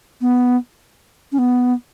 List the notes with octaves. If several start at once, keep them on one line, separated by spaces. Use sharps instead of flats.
B3
C#4
B3